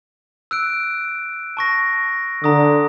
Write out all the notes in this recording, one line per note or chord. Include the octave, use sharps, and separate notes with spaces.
E6 F#6 D7
A5 C#6 A#6
D3 A#5 D#6